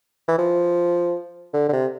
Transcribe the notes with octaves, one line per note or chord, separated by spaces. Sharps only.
E3
F3
D3
D3
C3